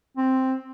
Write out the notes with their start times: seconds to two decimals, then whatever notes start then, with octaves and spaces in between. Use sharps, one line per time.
0.17 C4